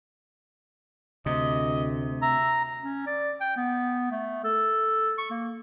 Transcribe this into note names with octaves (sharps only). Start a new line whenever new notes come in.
D2 C3 D#5
E5 A#5
C#4
D5
G5
B3
A3
A4
C#6
A#3